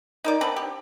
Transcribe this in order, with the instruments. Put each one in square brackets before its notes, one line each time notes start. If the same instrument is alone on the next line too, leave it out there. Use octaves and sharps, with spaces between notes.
[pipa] D#4 A#4 D5
B3 C4 D4
G4